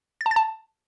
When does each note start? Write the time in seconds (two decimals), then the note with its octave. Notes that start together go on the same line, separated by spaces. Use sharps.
0.21 A6
0.26 A5
0.31 A6
0.36 A5